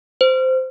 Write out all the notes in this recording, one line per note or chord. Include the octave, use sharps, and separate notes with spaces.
C5